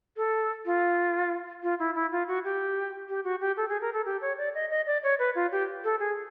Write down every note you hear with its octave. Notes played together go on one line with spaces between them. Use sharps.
A4
F4
F4
E4
E4
F4
F#4
G4
G4
F#4
G4
A4
G#4
A#4
A4
G4
C#5
D5
D#5
D#5
D5
C#5
B4
F4
G4
A4
G#4